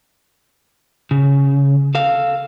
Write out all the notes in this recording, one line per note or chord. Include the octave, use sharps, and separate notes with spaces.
C#3
A4 F5